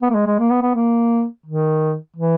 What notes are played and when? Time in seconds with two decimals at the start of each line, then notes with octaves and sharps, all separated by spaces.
0.02 B3
0.10 A#3
0.15 G#3
0.27 G#3
0.39 A#3
0.50 B3
0.62 B3
0.74 A#3
1.46 D#3
2.16 E3